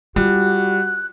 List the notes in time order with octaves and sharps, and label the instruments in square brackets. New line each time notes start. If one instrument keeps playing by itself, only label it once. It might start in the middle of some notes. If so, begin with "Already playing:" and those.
[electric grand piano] G3 [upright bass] F4 [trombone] F#4 [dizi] F#6